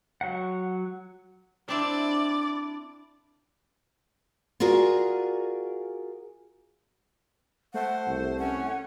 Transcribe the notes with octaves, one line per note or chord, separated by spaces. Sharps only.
F#3 F#5
C4 D4 E4 D5
F4 F#4 G#4 A#4 D5
A3 C5 F#5
C2
C#4 F#5